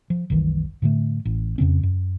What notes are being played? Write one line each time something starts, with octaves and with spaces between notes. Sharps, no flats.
F3
F#1 C2 D#3 E3
A2 D3 A3
A1
F2 C#3 C4 C#4
F#2